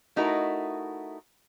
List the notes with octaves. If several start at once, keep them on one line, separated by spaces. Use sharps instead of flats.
A3 D#4 E4 F#4 A#4